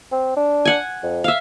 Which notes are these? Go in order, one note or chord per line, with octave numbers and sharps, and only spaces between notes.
C4
D4
F#5 G#5
F2
E5 F5